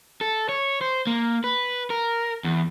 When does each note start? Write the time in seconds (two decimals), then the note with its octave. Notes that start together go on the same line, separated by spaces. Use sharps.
0.21 A4
0.49 C#5
0.81 C5
1.07 A#3
1.44 B4
1.90 A#4
2.44 E2